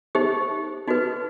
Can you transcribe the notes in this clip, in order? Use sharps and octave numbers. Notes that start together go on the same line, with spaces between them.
D#4 G4 C5
D#4 F#4 B4